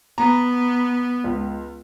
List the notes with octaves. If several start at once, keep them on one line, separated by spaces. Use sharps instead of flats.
B3 A#5
C#2